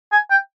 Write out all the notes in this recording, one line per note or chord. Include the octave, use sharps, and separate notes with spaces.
G#5
G5